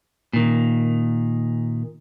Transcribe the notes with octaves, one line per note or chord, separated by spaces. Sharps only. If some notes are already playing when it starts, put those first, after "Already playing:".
A#2 D#3